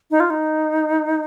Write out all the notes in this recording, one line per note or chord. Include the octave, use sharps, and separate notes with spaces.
D#4
F4
D#4